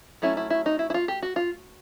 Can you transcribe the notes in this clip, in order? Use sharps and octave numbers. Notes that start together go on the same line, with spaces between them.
F#3 A3 C#4 E4
E4
E4
D#4
E4
E4
F4
G4
F#4
F4